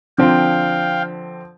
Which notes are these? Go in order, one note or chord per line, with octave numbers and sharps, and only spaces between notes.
D3 F3 C4 F5 G5